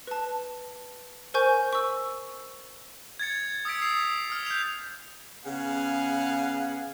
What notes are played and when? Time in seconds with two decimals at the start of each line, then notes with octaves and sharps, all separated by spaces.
0.07 B4 A5
1.34 A#4 C5 G#5 C#6 G6
1.73 C#6 E6
3.20 G#6 A6 C#7
3.65 D#6 E6 G#6 B6 D7
3.82 E6 C7 D7 F7
4.30 D#6 F6
4.46 G6 F7
5.45 C#3 B3 F5 F#5 G#5